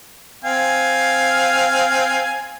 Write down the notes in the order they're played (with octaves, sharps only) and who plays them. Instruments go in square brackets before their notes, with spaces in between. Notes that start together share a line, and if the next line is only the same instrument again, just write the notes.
[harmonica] C4 F5 G#5